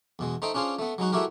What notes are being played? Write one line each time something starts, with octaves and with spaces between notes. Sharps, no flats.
E2 B2 G#3
A3 D#4 C5 D#5 G5
C#4 D4 F4 G#4 C5
A3 B3
F#3 G#3 D#4 F#4
G#3 A3 E4 F#4 G4 A#4